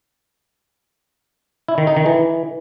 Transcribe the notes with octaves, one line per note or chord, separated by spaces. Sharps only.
E4
D#3
D#4
D#3
E3